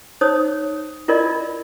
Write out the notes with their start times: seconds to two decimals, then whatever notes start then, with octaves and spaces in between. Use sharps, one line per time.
0.21 D#4 C5 C#5 D#6
1.08 E4 F4 A#4 D5 D#5